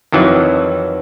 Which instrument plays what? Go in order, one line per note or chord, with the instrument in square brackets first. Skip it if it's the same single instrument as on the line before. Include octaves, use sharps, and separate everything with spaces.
[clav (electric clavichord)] F2 D#3 E3 F#3